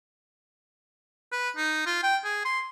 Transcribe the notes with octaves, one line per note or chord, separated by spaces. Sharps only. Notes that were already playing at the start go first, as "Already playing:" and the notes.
B4
D#4
F4
G5
G#4
C6